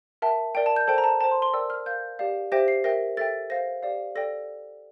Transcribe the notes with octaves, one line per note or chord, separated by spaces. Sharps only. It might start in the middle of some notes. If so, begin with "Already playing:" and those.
A#4 E5 G5 A5
A#4 D5 G5
A5
G6
A4 C5 G5 A5
A#5
A5
C5 G5 A5
C6
C6
A#4 D5 G5 E6
F6
A#4 F5 G6
G4 D5 F5
G4 C5 E5 G5 A#6
C7
A#4 E5 G5 A#6
A4 E5 G5 A6
C5 F5 A#6
G4 D5 F5
A4 D5 G5 A#6